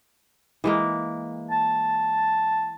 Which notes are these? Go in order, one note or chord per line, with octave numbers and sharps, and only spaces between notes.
E3 G#3 A#3
A5